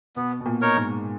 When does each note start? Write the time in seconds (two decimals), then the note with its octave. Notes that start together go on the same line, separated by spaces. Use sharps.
0.16 B2 B3
0.40 B2
0.46 A#2
0.61 D#4 A#4 C#5
0.76 G#2